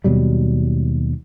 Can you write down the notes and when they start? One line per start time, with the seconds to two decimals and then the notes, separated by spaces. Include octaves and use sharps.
0.04 D#2 B2 F#3 G3